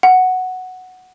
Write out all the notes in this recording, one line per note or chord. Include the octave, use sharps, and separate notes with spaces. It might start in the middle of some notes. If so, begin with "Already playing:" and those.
F#5